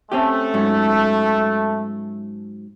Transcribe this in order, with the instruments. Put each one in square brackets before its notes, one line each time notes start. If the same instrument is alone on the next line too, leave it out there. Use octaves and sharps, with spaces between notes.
[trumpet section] A3 [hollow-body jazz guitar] C4 C#4 G4
[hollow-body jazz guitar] G#2 F#3 C#4